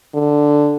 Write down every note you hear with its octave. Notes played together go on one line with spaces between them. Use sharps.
D3